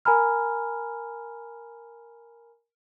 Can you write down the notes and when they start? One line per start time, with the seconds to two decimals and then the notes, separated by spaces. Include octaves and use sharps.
0.05 A#4 G#5 A#5 B5 F6